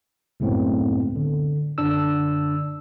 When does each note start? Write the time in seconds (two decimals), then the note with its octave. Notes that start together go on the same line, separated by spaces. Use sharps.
0.40 C#2 F#2 A2 B3 C4
1.16 D3
1.78 F#2 D3 D4 E6